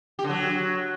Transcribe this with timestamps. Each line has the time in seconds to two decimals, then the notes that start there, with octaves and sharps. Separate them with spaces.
0.19 G4
0.24 D3
0.30 F#3